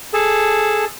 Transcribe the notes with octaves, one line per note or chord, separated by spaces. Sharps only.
G#4 A4 A5